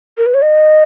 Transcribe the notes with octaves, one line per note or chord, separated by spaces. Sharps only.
A#4
B4
C#5
D#5